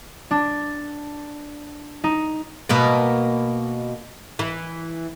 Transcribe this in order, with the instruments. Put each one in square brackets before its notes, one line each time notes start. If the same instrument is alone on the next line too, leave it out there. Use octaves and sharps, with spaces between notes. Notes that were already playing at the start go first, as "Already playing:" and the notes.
[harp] D4
D#4
[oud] B2 A#3 B4
E3